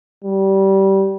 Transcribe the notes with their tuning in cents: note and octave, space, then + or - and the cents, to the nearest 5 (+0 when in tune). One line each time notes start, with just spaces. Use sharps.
G3 -20